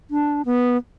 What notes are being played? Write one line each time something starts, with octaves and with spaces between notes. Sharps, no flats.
D4
B3